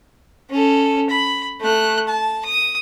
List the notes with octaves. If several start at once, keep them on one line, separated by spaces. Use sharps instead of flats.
C#4 A4
B5
A3 F#6
A5
D#6